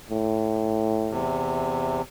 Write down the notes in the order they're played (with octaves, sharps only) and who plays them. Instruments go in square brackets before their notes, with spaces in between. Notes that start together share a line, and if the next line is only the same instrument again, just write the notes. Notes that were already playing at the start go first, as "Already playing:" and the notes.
[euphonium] A2
[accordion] E2 C3